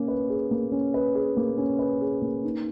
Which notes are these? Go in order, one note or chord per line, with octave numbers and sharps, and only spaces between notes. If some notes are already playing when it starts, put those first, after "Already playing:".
Already playing: A#3 C#4
B4
G#4
A#3
C#4
B4
G#4
A#3
C#4
B4
G#4
A#3
D#4